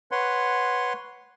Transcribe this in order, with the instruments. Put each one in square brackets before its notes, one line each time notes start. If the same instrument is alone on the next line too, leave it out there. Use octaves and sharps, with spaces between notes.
[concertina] B4 C#5 F#5 C6